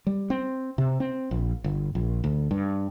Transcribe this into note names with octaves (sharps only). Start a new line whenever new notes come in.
G3
C4
C3
C4
A#1
G1
A#1
D2
G2